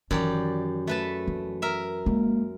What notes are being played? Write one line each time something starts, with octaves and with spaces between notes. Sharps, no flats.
F#2 D#3 E3 G4 D5
A3 B4 A5
E3
A#4 E5
G#3 A#3